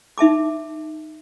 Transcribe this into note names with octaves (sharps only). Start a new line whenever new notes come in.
D#4 E5 A5 D6